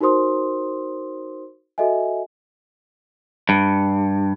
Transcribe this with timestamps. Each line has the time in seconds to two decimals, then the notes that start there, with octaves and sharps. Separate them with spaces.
0.01 D#4 F#4 A#4 C5 C6 D#6
1.78 F#4 A4 D#5 E5 G#5
3.49 G2